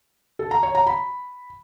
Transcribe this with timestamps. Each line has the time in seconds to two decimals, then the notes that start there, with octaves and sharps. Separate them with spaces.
0.39 A4
0.51 A#5
0.63 C#5
0.75 A#5
0.87 B5